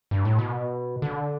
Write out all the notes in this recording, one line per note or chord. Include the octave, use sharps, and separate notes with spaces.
G2
A2
B2
D3